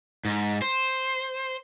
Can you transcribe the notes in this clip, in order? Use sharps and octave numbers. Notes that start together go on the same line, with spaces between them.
G#2
C5